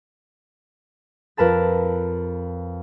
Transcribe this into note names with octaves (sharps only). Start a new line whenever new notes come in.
F2 A#4 B4 A5 A6